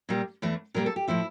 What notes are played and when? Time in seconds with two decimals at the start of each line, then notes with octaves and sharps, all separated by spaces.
0.09 A#2 G3 A#3
0.42 E2 E3 A3
0.74 A#2 G3 A#3 A#4
0.86 A4
0.96 G4
1.07 A2 F3 A3 E4